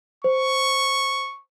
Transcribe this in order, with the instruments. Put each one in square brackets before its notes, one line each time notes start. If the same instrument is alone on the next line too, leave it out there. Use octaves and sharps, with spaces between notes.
[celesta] C5 [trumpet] C#6